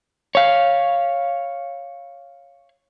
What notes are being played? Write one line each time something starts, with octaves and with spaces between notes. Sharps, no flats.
C#5 F5